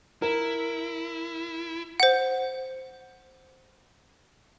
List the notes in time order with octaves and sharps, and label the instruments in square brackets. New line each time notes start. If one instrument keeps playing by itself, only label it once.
[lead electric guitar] E4 [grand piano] A#4
[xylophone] C5 F#5